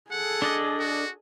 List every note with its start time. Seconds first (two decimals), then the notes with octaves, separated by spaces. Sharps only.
0.11 G#4 A4 F#5
0.42 D4 D5 D#5
0.79 F#4